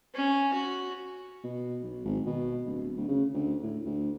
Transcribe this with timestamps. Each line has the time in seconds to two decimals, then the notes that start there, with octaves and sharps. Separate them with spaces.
0.15 C#4
0.54 F#4
1.44 B2
1.83 B1
2.05 G#1
2.26 B2
2.66 D1
2.97 D2
3.08 C#3
3.34 D2
3.63 A2
3.86 D2